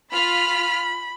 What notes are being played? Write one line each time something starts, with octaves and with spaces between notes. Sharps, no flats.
F4 B5 F6 B6